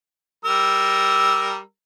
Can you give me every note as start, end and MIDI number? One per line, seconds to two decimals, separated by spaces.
0.45 1.59 55
0.45 1.59 70
0.45 1.59 88